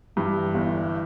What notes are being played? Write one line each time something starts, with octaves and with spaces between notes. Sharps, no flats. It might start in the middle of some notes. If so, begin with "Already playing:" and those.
G2 E3
G1